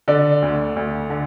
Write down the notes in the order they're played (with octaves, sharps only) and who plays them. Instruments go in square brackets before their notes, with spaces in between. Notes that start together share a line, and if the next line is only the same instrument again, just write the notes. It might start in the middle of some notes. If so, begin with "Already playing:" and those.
[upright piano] D3 D5
D2
D2
D3